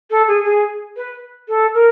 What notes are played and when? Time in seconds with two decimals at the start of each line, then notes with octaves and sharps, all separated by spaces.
0.10 A4
0.27 G#4
0.44 G#4
0.96 B4
1.48 A4
1.74 A#4